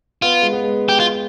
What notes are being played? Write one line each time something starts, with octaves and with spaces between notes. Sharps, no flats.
B3 F4
G#3
B3
G#3
G4
F4